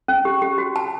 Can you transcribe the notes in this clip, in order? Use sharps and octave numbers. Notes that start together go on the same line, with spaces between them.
C#4
G4
G4
F#4
A5